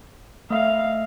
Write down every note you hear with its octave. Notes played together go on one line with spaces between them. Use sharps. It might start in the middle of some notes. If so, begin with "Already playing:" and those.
A3 E5 F5